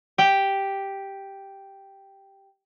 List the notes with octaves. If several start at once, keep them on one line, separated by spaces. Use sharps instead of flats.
G4 G5